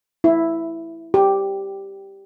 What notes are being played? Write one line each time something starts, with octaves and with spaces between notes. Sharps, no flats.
E4
G4